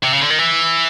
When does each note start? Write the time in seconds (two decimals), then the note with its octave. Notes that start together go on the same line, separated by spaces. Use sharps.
0.04 C3
0.13 C#3
0.21 D3
0.30 D#3
0.39 E3